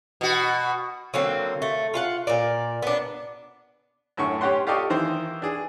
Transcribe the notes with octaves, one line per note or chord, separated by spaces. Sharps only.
B2 F#4
D3 F#3 A#3 C4
A3
F4 F5 F#5
A#2 A#4 D5
B3 D4
F#2 A2 D3 C#6
C#4 G4 C#5 F#5 C6
F4 G4 A4 D5 D#5 C#6
D#3 E3 C5
D4 G#4